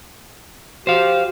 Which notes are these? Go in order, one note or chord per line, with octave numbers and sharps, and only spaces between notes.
F#4 G4 C5 F5